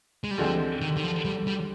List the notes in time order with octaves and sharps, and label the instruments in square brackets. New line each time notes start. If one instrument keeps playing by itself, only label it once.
[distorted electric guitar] G#3
G3
[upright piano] D2 D3 G#3 C4 G4 [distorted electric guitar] F3
[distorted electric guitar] D#3
D#3
F3
G3
G3